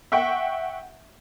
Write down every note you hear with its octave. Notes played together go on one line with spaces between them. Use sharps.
E5 F#5 G5 C#6